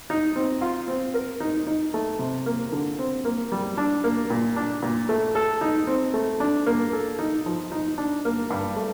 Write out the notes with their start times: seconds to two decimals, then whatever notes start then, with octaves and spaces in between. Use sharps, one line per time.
0.10 D#4
0.36 C4
0.61 F4
0.88 C4
1.14 A#4
1.40 D#4
1.67 D#4
1.94 A3
2.19 C3
2.46 A#3
2.72 D3
2.99 C4
3.25 A#3
3.52 G3
3.78 D4
4.04 A#3
4.30 A#2
4.56 D4
4.82 A#2
5.09 A3
5.35 A4
5.61 D#4
5.87 C4
6.14 A3
6.40 D4
6.66 A#3
6.93 A4
7.19 D#4
7.46 F3
7.72 D#4
7.98 D4
8.25 A#3
8.50 G2
8.76 A3